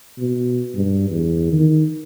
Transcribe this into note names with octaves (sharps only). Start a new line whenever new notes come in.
B2
G2
E2
D#3